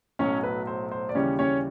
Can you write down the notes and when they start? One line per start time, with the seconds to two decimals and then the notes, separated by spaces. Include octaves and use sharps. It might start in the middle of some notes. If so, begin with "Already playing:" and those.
0.19 B1 A2 F#3 C#4 C#5
0.43 B4
0.67 C5
0.92 C5
1.09 D5
1.15 D#2 C#3 E3 G3 C#4 C#5
1.39 C#4 C#5